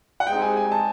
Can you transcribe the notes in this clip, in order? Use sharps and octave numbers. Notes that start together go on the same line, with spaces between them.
F#5
G#3 C4 D#4 G4 G5
G#5
G#5
A5